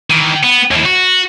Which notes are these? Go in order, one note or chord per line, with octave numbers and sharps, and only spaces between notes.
D#3 E3
B3
D#2 E4
F#4